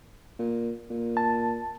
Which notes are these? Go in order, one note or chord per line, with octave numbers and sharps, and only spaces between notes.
A#2
A#2
A5